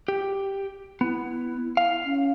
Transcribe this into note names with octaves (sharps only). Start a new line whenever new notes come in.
G4
B3 E4
F5
C#4